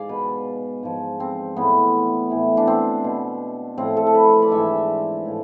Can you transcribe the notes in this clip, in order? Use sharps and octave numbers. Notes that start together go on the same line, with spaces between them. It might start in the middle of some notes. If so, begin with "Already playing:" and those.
Already playing: G#2 D5 F5 G#5
B2 B4
G#2 F3
C4
A2 E3 B3
A2 E3
D4
C4
B2
A2 F3 C4
A4
A4
B4
D5
G#2 E3 E5
A2 F3